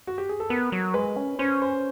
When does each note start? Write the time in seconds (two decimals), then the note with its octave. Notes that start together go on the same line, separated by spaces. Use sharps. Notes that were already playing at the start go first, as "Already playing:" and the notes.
0.07 F#4
0.18 G4
0.29 G#4
0.40 A4
0.49 B3 A#4
0.72 F#3
0.94 G#3 B4
1.16 C#4
1.39 C#4 C5
1.62 C5